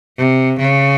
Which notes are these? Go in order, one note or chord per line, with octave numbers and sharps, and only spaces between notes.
C3
C#3